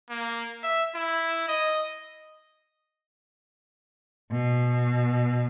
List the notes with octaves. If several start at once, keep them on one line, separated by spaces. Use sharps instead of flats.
A#3
E5
E4
D#5
B2